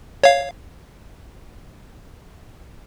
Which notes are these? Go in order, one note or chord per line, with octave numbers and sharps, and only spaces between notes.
C#5 F5